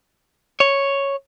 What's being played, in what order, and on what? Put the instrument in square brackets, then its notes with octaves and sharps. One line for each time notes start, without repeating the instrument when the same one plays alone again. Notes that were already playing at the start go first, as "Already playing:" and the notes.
[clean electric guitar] C#5